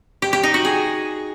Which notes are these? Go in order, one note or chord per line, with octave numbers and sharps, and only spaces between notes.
G4
G4
D#4
F#4
G#4